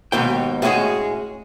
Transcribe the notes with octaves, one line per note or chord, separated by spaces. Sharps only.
D#2 G#2 B2 G5
A2 G#3 C#4 E4 F#4 G#4